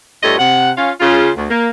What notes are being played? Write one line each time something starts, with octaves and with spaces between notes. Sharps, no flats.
G2 G3 A3 F4 C#5 D#5
C3 F#5
C#4 F4 F5
C#3 F4
D2
A#3